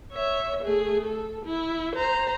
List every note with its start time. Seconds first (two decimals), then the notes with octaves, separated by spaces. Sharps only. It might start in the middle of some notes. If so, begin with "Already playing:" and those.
0.13 C#5 E5
0.63 A3 G#4
1.06 A4
1.46 E4
1.96 C5 A#5